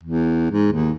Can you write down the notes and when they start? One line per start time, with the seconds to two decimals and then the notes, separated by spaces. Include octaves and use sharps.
0.04 E2
0.51 G#2
0.73 D#2